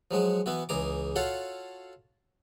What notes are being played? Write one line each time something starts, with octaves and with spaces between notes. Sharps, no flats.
F3 F#3 G#3 F#4
E3 B3 E4 F#4
C#2 E3 G#4 A#5 D6
F4 F#4 A4 C#5 F5 F#5